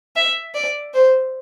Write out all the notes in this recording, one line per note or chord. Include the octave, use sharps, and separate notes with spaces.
E5
D5
C5